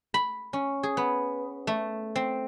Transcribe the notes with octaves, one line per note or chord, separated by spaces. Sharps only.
B5
C#4
G#4
B3
A3
C4